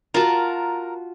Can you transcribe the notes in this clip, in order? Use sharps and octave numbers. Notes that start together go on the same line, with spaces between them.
F4 F#4 A#4 A5